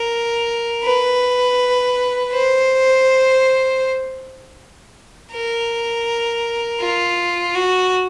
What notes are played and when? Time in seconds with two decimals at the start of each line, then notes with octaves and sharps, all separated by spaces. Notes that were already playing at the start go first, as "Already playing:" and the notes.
Already playing: A#4
0.84 B4
2.33 C5
5.32 A#4
6.80 F4
7.55 F#4